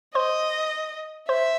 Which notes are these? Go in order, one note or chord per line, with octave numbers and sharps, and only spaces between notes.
C5 D#5 C6
C5 E5 C6